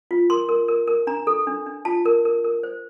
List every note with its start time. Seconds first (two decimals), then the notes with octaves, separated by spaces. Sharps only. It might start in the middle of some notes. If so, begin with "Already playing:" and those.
0.11 F4
0.30 A#4 C6
0.49 A#4
0.68 A#4
0.88 A#4
1.07 D4 A#5
1.27 A4
1.47 D4
1.66 D4
1.85 F4 A5
2.06 A#4
2.25 A#4
2.44 A#4
2.63 C5